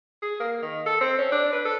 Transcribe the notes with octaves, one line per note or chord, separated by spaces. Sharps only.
G#4
A#3
D#3
A4
C4
C#4
D4
B4
A4